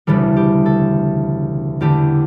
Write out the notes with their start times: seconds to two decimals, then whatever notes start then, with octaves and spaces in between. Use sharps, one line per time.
0.07 E1 D2 C#3 E3 G3 A4
0.36 G4
0.66 A4
1.81 E2 D3 A3 G4